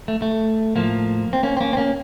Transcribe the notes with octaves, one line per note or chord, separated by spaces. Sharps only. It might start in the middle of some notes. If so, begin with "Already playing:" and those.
A3
A3
A2 F3 A#3
C4
A#3 C#4
C4
A#3 C#4
C4
A#3 C#4